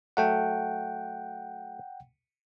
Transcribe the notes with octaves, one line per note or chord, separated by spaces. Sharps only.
F#3 A3 F#5 G5